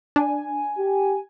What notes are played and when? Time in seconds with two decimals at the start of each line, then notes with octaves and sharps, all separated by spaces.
0.16 D4 G#5
0.78 G4